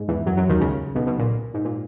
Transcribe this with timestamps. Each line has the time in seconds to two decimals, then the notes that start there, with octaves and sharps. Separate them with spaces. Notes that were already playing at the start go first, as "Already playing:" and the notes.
Already playing: G#2 G#3
0.08 E2 E3
0.26 F#2 F#3
0.37 F#2 F#3
0.49 D#2 D#3
0.60 C#2 C#3
0.95 B1 B2
1.07 B1 B2
1.19 A#2
1.54 G#2
1.65 A#2